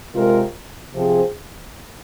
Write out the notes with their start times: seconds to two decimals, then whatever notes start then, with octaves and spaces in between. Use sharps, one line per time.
0.15 C3 G#3 F4 A#4
0.94 C3 F3 C4 G#4